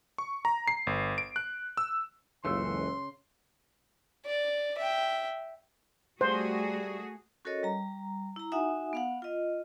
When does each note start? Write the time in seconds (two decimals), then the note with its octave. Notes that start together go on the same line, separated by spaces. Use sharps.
0.18 C#6
0.45 A#5
0.68 C7
0.87 G1
1.18 D7
1.36 F#6
1.77 E6
2.45 F#1 C#2 C#3 E3 A4 C6 E6
4.26 D5
4.78 E5 G5
6.21 G3 A3 F#4 G#4 C5
7.45 C#4 F#4 A4 A#4 C#5 D#5
7.63 G3 A#5
8.36 E4 A#5
8.52 D#4 F#4 E5 F#5 G#5 D#6
8.93 B3 F5 F#5
9.22 F4 D#5